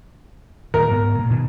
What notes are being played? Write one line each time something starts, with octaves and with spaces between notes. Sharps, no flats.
D1 D#3 A#4
G#2 B3
A#2
B2 D#3